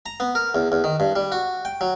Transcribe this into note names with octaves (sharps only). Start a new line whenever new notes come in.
A#5
B3
A#4
E2
E2
D#3
G2
G3
F#4
G5
F#3